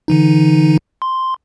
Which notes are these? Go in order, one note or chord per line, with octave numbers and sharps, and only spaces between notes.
D3 E3 D#4
C6